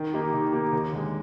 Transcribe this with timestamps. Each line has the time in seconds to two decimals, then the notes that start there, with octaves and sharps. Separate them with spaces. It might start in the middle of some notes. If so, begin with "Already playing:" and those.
Already playing: D#3
0.13 A#3 D#4 G4
0.34 D#3
0.53 A#3 D#4 G4
0.73 D#2
0.93 D3 G#3